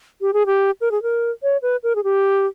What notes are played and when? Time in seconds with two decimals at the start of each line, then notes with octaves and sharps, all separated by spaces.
0.21 G4
0.33 G#4
0.46 G4
0.81 A#4
0.91 G#4
1.03 A#4
1.43 C#5
1.62 B4
1.83 A#4
1.96 G#4
2.04 G4